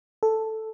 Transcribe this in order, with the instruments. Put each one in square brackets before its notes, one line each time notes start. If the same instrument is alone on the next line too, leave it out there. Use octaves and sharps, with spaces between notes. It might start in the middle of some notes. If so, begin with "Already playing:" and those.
[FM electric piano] A4